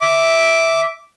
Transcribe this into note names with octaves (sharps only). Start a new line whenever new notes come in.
E5 D6